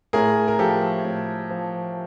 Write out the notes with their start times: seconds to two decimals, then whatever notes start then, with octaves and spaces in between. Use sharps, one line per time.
0.13 A2 G#4 A#4
0.48 A#4
0.59 F3 G4 A4
1.05 A2
1.51 F3